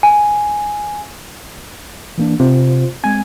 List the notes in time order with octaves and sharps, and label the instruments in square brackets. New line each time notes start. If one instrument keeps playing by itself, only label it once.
[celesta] G#5
[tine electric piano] E3 A#3 D4
[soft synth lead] C3 [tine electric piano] F4 C5
[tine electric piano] G#3 C4 [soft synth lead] G#5